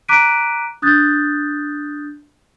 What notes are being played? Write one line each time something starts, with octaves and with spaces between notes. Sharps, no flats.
A#5 D6 F#6 B6 D7 D#7
D4 D#6 F#6 G6 A6